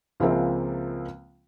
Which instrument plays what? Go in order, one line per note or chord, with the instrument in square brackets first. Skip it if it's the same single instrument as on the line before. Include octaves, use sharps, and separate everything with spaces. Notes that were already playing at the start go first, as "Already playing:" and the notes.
[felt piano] C#2 F3 G#3 A#3 C4 E5